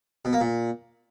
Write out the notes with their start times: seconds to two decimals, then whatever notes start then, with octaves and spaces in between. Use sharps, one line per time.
0.25 B2
0.33 A#3
0.41 A#2